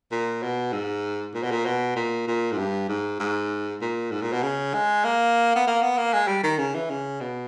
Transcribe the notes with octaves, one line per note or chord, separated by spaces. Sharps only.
A#2
B2
G#2
A#2
B2
A#2
B2
A#2
A#2
G#2
G2
G#2
G#2
A#2
G#2
A#2
B2
C#3
G#3
A#3
B3
A#3
B3
A#3
G#3
G3
D#3
C#3
E3
C#3
B2